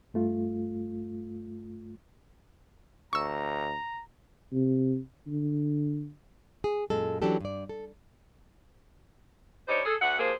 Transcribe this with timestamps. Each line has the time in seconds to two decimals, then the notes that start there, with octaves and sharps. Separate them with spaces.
0.14 G2 A3 F4
3.13 D2 A#5 C#6 E6
4.53 C3
5.27 D3
6.64 G#4
6.90 F#2 A#2 G#3 A4
7.22 E3 F#3 C#4 D4 G4 A4
7.41 G2 D5
7.69 A4
9.68 G3 D4 D#4 C5 C#5
9.86 G#4 A4
10.01 D2 E5 F#5
10.19 C3 F3 A#3 G#4 C5